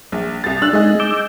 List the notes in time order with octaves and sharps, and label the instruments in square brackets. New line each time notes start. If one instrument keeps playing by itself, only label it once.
[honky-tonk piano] A#1
C2 A6
[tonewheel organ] D4 F#6 [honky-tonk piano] E6
[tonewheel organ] G#3 D#4 [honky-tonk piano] G#4 D#5
[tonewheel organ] D6 E6 G6